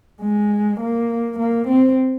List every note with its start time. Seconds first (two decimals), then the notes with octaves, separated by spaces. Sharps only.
0.21 G#3
0.80 A#3
1.39 A#3
1.68 C4